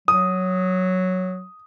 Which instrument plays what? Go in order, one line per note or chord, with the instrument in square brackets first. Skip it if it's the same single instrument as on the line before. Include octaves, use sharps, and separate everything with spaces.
[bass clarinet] F#3 [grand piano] D#6